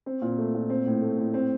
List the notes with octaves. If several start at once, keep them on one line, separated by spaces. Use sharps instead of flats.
C4
A#2
A3
A#2
C4
A2
A3
A2
C4